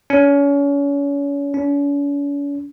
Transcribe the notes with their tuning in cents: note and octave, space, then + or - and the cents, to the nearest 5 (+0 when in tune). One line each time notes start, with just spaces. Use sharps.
C#4 +35
C#4 +45